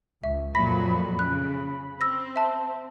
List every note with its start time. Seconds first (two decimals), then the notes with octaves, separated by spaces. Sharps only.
0.24 C#2 E5
0.55 F2 A#2 F#3 B5 A#6
1.19 C#3 F#6
2.01 C4 E6 A#6
2.36 E5 A5